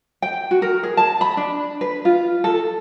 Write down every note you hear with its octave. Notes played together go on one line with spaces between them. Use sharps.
G5
F#4
A#4
G#4
A5
B5
D4
B4
F4
A4